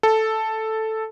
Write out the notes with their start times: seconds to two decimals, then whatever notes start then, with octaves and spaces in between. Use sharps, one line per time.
0.03 A4